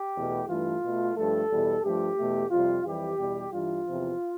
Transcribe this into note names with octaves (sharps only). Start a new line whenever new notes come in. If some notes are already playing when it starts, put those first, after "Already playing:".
Already playing: G4
E2 B2 A3
G2 E3 A3 F4
B2 A3
G2 F3 A3 A4
E2 B2 G3
G2 F3 A3 G4
E2 B2 A3
F2 C3 G3 F4
F2 E3 G3 G4
E2 B2 G3
G2 E3 G3 F4
E2 C3 F3